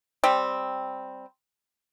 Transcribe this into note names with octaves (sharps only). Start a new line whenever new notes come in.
G3 C4